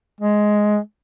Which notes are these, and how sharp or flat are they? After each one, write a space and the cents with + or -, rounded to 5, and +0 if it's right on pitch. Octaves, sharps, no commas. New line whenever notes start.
G#3 +10